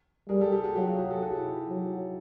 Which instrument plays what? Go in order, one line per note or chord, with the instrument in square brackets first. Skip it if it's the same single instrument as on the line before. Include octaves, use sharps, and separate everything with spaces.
[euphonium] G3 [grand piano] G#4 A#4
[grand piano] G4 A4
G4 A4
F#4 G#4
[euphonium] F#3 [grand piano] F4 G4
[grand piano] F#4 G#4
F#4 G#4
G4 A4
F#4 G#4
G4
E4 F#4
[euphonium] F#3